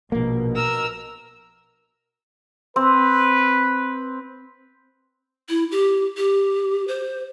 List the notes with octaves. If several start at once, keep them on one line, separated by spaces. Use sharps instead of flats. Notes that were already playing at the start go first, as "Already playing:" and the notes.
A#1 B2 A#3
A#4 E6
C4 B4
E4
G4
G4
C5